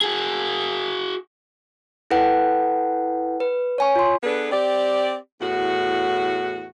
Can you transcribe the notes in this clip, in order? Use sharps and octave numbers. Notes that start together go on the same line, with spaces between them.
F#4 G#4
E4 A4 B4 F#5 G5
B4
C#5 G#5 C#6
F4 C6
B3 D4 G#4 A4 B4
C4 G4 D5
E2 A2 F#4